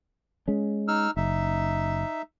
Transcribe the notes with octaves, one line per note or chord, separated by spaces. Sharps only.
G#3 C#4
D#4 E6 F6
F#1 D#4 E5